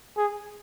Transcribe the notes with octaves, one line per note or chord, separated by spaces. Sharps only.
G#4